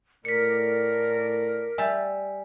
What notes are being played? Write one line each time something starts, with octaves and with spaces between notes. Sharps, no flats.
A2 A#4 D5 B6 C#7
G3 E5 G#5 A5